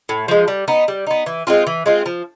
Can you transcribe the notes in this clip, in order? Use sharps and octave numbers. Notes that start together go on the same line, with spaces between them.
A2
F3 G#3
G3
B3 D#4
G3
B3 D#4
E3
G#3 C4 F4
E3
G#3 C4 F4
F3